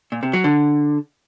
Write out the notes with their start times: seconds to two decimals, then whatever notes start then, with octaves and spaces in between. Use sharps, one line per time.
0.12 A#2
0.23 C3
0.33 F#3
0.44 D3